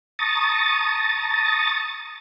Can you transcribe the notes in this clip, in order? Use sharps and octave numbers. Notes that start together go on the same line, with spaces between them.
A5 A#5 C#6 D#6 A6